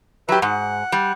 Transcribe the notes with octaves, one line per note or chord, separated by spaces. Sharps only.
F#3 G4 B4 E5
G#2 F#5
G3